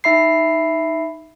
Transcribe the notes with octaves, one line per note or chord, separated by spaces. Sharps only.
D#4 E5 B5 C7